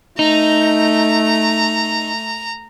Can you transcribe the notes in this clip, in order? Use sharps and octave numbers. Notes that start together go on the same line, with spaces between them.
A3 D#4 A#5